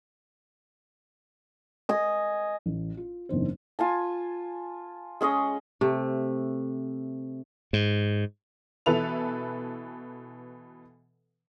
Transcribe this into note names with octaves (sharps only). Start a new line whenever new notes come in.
D#5 G#5
A1
F4
F#1 E2 G#2 C4 D4 C5
F4 G#5 A5
G#3 C#4 G#4 D#5
C3 A3
G#2
B2 E3 A4 B4 E5 F7